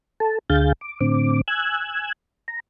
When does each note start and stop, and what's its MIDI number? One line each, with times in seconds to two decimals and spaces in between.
0.20 0.38 69
0.20 0.38 81
0.50 0.72 38
0.50 0.72 50
0.50 0.72 68
0.50 0.72 77
0.50 0.72 91
0.50 0.72 93
0.81 0.99 86
1.01 1.41 45
1.01 1.41 50
1.01 1.41 60
1.01 1.41 86
1.48 2.12 80
1.48 2.12 88
1.48 2.12 90
1.48 2.12 92
2.48 2.60 82